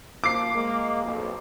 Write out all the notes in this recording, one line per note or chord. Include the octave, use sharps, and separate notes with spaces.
F3 A#3 D6 C7
G#3 A#3
B1 F2